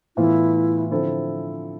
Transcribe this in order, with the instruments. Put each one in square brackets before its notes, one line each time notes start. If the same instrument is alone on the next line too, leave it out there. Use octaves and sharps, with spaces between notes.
[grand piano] A2 E3 B3 F4 [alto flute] E4
[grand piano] D3 F3 C4 E4 A4